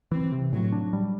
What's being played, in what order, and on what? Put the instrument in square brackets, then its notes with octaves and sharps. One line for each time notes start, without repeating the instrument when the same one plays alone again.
[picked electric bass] E3 [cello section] C4
[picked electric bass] C3
[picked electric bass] A2 [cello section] F#3
[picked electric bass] D4
G3